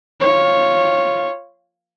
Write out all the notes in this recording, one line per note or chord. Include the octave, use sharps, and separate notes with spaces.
F4 C#5